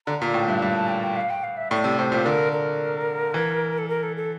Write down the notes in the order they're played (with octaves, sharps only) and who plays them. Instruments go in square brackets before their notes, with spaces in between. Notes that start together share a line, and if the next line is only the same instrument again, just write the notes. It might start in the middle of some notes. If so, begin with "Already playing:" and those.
[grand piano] D3 [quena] A#5
[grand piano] A#2 [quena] A#5
[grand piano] A2 [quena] G5
[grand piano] G2 [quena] E5
[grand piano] G2 [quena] F5
[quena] A5
G5
G5
F5
G5
F5
E5
[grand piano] A2 [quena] D5
[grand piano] C3
[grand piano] A2 [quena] C5
[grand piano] A#2
[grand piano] D3 [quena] A#4
[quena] A#4
[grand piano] E3
[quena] A4
A#4
A4
A4